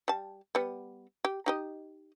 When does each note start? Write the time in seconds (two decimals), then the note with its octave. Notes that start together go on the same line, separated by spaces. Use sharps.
0.08 G3 A5
0.55 G3 B3
1.25 G4
1.46 D#4 G4 D#5